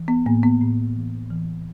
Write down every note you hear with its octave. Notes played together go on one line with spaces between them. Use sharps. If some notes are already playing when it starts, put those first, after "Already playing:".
Already playing: E3
B3
A2 A#3
B3
A2
E3
E3